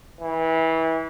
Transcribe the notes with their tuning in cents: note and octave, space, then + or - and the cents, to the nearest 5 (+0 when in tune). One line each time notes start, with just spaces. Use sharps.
E3 -25